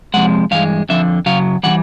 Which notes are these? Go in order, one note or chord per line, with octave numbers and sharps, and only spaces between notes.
F2 C3 F3 G#3 F#5
G2 E3 G#3 F5
F2 D3 F3 E5
F#2 C#3 F#3 F5
C#3 E3 G3 F#5